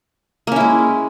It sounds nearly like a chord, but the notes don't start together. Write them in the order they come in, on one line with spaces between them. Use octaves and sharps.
A#3 C#4 E4 G#3